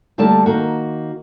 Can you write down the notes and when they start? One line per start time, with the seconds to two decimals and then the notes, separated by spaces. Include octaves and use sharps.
0.18 D2 G3 A3 A#3 D5 A5
0.46 D#3 A#3 F#4